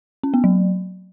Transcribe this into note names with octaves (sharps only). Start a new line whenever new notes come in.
C#4
B3
F#3